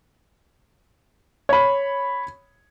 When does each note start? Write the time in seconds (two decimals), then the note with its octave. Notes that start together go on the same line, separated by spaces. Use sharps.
1.49 C#5 B5